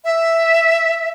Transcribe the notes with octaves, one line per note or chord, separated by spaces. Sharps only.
E5